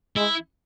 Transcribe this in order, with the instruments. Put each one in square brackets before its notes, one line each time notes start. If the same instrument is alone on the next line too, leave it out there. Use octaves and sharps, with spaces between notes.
[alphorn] G#3 [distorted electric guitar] E4